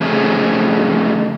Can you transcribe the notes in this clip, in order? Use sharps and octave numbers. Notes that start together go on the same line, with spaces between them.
F2 C#3 A3 G#4